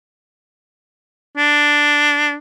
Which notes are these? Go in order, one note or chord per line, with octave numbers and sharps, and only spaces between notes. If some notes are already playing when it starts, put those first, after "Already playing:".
D4